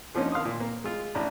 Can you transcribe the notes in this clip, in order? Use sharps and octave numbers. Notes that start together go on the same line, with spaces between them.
D3 F3 A#3 C#4 D#4
D#3 F5 C6 D#6
A#2
A#3
G#3 F4
A1 A2 D4 A#5